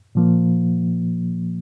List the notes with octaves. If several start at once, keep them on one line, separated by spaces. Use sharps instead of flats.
A#2 F3 A#3